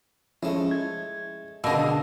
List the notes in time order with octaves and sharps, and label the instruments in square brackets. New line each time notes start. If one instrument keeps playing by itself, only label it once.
[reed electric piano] F3 C#4 E4 [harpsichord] G#3 A3
[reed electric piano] G#6
[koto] B2 D3 [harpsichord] A#3 D4 G#4 [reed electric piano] E6